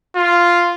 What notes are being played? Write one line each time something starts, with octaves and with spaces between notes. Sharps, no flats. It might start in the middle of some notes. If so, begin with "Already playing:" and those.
F4